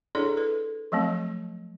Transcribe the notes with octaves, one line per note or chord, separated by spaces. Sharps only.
D4 E4 G#4 A4 C#5 D5
A4 B4
F3 F#3 A3 C4